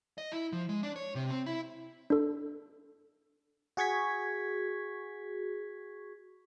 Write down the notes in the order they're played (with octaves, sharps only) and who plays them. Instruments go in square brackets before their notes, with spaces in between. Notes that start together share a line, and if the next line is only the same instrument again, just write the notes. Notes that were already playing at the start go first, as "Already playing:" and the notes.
[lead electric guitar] D#5
E4
F3
G#3
D4
C#5
C3
C4
E4
[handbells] D4 A4
[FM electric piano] F#4 G#4 C#6 G#6 B6